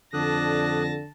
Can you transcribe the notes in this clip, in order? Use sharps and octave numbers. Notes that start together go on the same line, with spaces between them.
F2 D3 D4 A5 D#6 F#6 A#6